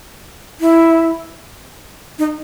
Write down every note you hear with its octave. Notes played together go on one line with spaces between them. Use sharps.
E4
D#4